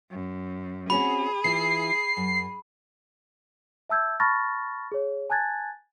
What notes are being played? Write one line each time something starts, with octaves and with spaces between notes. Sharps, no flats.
F#2
C4 C#4 F#4 G#4 B5
E3 E4 F4 C7
F#2
E5 A5 E6 G6 G#6
A5 B5 C#6 F6 A6 A#6
G#4 C#5
G#5 A5 F#6 G#6 A6